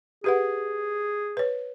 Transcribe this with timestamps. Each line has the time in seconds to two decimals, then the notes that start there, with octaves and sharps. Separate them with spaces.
0.24 G4 G#4 B4 F#5
1.37 B4 C#5